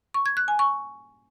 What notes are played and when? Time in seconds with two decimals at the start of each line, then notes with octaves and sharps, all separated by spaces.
0.14 C#6
0.26 G#6
0.37 F#6
0.48 G#5
0.59 C#6